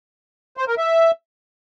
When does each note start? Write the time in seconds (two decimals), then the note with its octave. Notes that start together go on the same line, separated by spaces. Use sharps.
0.57 C5
0.68 A#4
0.78 E5